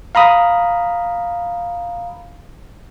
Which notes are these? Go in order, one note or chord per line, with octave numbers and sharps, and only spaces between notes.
F5 A#5 B5 D#6